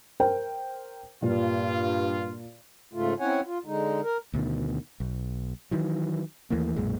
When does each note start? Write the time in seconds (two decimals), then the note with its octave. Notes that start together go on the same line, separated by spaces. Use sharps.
0.20 A#4 C5 G5
1.22 G2 A#2 F4
2.93 G#2 C#3 A3 F4
3.20 C4 C#4 E4 C#5 F#5 G#5
3.46 F4
3.66 D3 G#3 D#4
4.03 A#4
4.34 D2 B2 D#3
5.00 B1
5.71 D#3 E3 F#3
6.50 D#2 E3 A3 A#3
6.76 B1 F#2 A#2 G#3